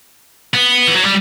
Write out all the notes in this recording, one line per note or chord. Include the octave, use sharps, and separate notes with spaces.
B3
E3
F#3
G3